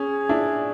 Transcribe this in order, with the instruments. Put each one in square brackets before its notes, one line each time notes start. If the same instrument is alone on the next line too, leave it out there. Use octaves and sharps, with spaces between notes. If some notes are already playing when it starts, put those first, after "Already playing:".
Already playing: [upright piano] C#4 [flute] G#4
[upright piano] D4 E4